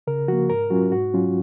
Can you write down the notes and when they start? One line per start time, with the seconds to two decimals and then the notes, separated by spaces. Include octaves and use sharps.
0.07 C#3 A#4
0.28 F3 A#3 F#4
0.50 G#2 A#4
0.70 F#3 C#4 F4 F#4
0.92 G#2 F#4
1.14 F#3 C#4 F4